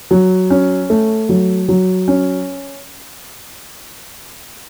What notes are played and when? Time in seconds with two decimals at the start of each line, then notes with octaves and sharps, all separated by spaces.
0.11 F#3
0.50 C#4
0.90 A3
1.29 F#3
1.68 F#3
2.08 C#4